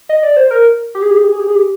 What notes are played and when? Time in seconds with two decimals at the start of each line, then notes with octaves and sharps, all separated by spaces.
0.09 D#5
0.23 D5
0.37 C5
0.51 A#4
0.95 G4
1.02 G#4
1.11 G4
1.17 G#4
1.24 G4
1.32 G#4
1.40 G4
1.47 G#4
1.55 G4